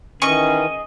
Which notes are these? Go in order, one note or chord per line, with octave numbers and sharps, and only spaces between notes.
D#3 E3 C#4 G#4 D#5 C#6